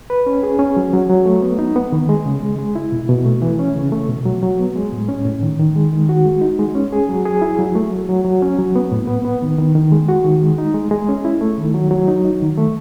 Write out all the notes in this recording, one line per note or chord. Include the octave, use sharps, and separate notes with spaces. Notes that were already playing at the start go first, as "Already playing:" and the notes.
B4
C#4
G#4
C#4
F#3
F#3
F#3
A3
B3
D#4
B3
D#3
G#3
C#3
G#3
G#3
E4
B2
B2
A3
E3
C#4
C#3
A3
B2
F#3
F#3
B3
G#3
A2
C#4
A2
D#3
D#3
G#3
D#3
F#4
G#3
D#4
G#3
C#4
G#4
F#3
G#4
E4
F#3
A3
F#3
F#3
F#3
C#4
F#3
B3
A2
B3
B3
D#3
D#3
D#3
G#3
F#4
D#3
G#3
D#4
G#3
G#3
C#4
E4
A3
D#3
F#3
F#3
D#4
D#4
D#3
A3